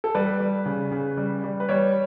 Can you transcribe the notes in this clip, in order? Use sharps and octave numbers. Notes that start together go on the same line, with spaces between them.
A4
G3 B4
G3
C#3
C#3
G3
G3
B4
G3 C#5